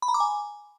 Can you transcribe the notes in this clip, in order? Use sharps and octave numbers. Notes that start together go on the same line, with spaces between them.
B5
A#5
D6
G#5